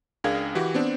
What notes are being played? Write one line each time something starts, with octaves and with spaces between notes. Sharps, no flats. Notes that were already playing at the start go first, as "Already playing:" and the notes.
C#2 D4 G#4 A#4 F5 G#6
E3 F#4 G4
B3 C4 D4